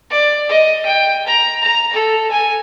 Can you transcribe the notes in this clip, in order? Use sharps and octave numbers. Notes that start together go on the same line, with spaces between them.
D5
D#5
G5
A#5
A#5
A4
G#5